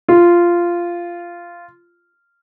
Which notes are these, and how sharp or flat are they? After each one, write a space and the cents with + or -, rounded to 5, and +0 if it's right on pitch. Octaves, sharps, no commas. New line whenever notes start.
F4 -10